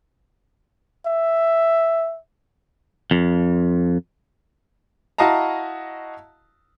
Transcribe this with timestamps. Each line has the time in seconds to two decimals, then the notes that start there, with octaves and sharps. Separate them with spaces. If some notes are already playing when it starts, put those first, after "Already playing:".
1.06 E5
3.11 F2
5.18 E4 F#4 D#5 F5 A5 A#5